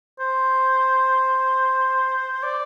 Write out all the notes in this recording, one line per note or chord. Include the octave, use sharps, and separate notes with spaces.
C5
D5